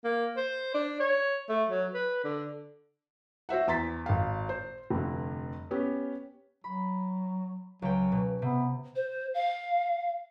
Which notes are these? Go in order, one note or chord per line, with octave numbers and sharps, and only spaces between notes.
A#3
C5
D4
C#5
A3
F#3
B4
D3
F#4 C5 E5 F#5
E2 A#5 C6 A6 B6
G#1 F5
C5
F1 G2 D3
B3 C#4 G4
F#3 B5
C#2 F#3 G5
B2
C3 B3
C5
F5